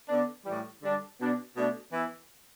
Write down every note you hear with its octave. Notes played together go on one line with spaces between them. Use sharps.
D3 B3 D4
A2 E3 G3
D3 G3 D4
B2 B3 D4
B2 A3 D4
E3 B3 E4